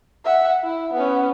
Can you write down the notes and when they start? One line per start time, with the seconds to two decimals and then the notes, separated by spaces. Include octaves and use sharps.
0.25 E5 F#5
0.64 E4
0.94 B3 C#4